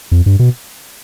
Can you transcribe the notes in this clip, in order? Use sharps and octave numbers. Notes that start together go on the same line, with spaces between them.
F2
G2
B2